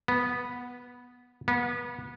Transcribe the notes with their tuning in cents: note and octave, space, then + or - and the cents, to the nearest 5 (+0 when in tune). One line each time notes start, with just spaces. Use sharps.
B3 -10
B3 -30